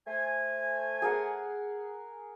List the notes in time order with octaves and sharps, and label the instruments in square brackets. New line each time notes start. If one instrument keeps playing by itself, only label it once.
[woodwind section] A3 C5 G#5
[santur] G#4 A#4 F#5